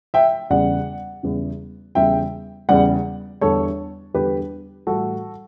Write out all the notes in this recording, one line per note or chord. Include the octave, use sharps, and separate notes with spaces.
E5 G5
E2 C#3 G3 D5 F#5
E2 C#3 G3
E2 C#3 G3 E5 G5
E2 C#3 G3 D5 F#5
E2 D3 G3 A4 C#5
E2 D3 G3 G4 B4
A2 E3 G3 F#4 A4